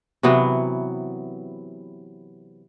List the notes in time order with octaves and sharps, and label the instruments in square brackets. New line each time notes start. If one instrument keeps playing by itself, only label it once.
[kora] C3 E3 F#3 B3